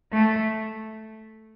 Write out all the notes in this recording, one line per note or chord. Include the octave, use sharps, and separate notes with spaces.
A3